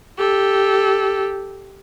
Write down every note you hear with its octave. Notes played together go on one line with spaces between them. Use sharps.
G4 A4